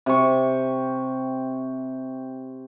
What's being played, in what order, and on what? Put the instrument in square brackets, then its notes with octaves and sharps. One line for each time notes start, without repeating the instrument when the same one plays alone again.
[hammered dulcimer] C3 G4 C#6